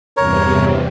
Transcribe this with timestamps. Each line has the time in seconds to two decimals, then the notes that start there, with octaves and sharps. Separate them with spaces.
0.17 E2 G2 C3 A#4 C#5